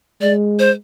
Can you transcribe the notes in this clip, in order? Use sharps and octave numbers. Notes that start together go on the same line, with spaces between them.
G#3 D5
C5